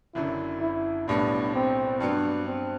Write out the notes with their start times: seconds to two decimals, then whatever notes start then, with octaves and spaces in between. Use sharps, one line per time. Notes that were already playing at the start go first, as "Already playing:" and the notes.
0.15 F#1 F#2 D3 E4
0.61 E4
1.08 B1 A2 G3 B3 D4
1.55 C4
2.00 G2 F#3 B3 D4
2.47 C4